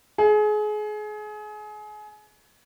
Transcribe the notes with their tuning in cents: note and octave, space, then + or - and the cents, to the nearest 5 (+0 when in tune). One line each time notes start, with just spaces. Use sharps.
G#4 +30